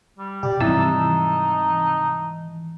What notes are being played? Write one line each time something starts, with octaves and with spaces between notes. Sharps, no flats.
G3
B2 G4 D5
G#2 C3 E3 F3 G3 D#4 A5 E6